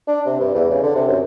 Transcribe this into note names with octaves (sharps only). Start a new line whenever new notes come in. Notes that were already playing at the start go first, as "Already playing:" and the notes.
D4
C3
G2
E2
C#3
D3
C3
F#2